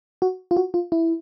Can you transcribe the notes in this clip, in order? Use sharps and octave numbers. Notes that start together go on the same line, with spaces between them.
F#4
F4
F#4
F4
E4